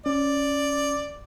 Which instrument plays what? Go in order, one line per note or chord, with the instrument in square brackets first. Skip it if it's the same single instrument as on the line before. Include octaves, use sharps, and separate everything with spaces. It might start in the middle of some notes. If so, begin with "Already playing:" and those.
[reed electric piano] C#4 [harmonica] D5